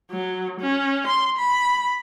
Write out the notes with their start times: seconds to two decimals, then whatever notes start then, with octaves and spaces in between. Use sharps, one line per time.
0.11 F#3
0.60 C#4
1.07 C6
1.38 B5